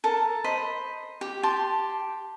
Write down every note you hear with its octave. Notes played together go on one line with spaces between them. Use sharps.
A4 A#4 A5
C5 D#5 B5
G4
G4 A5 C6